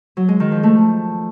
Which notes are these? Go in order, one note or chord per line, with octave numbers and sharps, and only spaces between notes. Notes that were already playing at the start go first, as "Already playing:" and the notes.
F#3
G#3
D#3
F3
A3